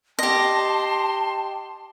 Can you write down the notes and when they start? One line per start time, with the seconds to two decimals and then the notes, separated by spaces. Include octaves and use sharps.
0.19 G4 D#5 A5 C6